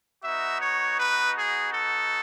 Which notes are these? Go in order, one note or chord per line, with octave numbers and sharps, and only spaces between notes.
B3 D#4 F#4 E5
C#5
B4
G#4
A4